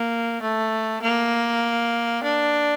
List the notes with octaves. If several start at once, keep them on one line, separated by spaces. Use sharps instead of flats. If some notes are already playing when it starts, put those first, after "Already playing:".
Already playing: A#3
A3
A#3
D4